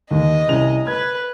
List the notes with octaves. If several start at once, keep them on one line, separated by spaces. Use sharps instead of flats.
D#2 D#5
C2 C#4 F7
B4 G#6